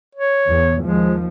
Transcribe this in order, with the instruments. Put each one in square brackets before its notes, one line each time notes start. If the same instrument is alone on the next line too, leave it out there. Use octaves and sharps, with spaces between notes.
[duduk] C#5
[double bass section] E2
[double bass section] D#2 F3 [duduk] G#3